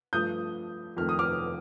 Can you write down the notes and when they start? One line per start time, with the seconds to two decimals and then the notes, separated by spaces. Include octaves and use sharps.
0.13 G2 F3 A3 D#6 G6
0.97 F2 D#3 A3 F6
1.09 D#6
1.19 D6 F6